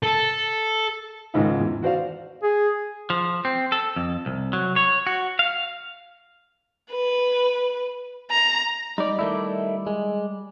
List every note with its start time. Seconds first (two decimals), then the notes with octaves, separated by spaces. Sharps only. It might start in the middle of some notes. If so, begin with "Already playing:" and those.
0.03 A4
1.34 C#2 G#2 D#3
1.60 E2
1.83 F#4 C5 D5 F5
2.43 G#4
3.10 F3
3.45 C4
3.72 A4
3.96 F2
4.26 C2
4.53 F#3
4.76 C#5
5.07 F#4
5.39 F5
6.91 B4
8.31 A#5
8.98 G3 D#4 D5
9.19 D#3 A3 E4
9.87 G#3